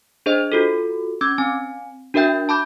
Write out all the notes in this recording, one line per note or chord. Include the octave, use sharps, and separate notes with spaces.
D4 G#4 C5 D#5
F4 F#4 A4
C#4 D6 E6 G#6
C4 G#5
D4 F#4 A#4 E5 G5 G6
A5 B5 D6 G6